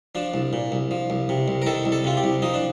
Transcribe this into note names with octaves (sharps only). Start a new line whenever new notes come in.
F3 D4
C2
A#2
C2
F3
C2
C3
C2
A#4
D#3 A4
C2
A4
C3 F4
G4
C2
F3 D#4
D4